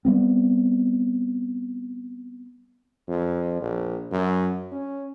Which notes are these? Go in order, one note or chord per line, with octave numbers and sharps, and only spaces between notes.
G3 B3 C4
F2
A#1
F#2
C#4